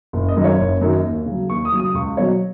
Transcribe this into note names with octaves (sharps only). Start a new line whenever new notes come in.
F#1
D#5
F#2 D#3 F#3
C#5
F#1
F#2 D#3 F#3
D#2
C#3
F#3
D#2 C#6
D#6
C#3 F#3
D#6
C#2 C#6
B2 F#3 C#5